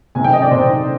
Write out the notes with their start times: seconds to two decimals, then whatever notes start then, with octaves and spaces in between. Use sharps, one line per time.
0.15 C3 D#3 G#5
0.24 G5
0.33 D#5
0.42 D5
0.51 C3 D#3 C5